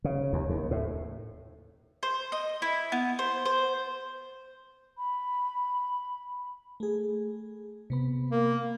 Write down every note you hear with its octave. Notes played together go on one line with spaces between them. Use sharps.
C#3
D#2
D#2
A2
C5
D#5
E4
B3
C5
C5
B5
A3 G#4
C3 B3 B5
A#3